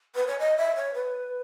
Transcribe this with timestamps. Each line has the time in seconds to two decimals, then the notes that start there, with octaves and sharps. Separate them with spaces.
0.15 B4
0.27 C#5
0.39 D#5
0.57 E5
0.76 C#5
0.94 B4